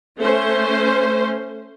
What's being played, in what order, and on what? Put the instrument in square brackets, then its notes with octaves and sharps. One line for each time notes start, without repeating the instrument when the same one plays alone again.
[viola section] A3 C#4 C5